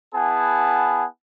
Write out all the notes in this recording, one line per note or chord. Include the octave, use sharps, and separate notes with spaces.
B3 E4 G#4 F#5 G#5 A5